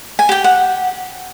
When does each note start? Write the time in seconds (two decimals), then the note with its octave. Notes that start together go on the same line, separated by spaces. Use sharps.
0.19 G#5
0.29 G4 G5
0.44 F#5